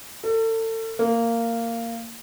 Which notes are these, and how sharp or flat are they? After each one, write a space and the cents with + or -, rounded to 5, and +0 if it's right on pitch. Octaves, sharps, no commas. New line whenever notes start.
A4 +35
A#3 -15